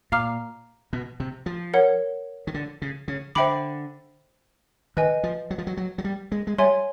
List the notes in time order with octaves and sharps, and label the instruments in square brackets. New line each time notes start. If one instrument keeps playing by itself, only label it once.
[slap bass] A#2 [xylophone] F5 A#5 D6 F6
[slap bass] B2
C3
F3
[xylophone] A#4 C#5 F#5
[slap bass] D#3
D3
C#3
C#3
[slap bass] D3 [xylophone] C5 E5 G5 B5 D6
[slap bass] D#3 [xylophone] B4 D#5 G#5
[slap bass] F3
F#3
F3
F#3
F#3
F#3
G3
G#3
G#3
[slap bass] G3 [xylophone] C#5 E5 G#5 C6